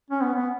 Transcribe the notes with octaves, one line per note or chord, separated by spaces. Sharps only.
C#4
B3
B3